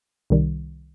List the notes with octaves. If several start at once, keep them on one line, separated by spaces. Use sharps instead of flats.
C2 C3 D#3 G3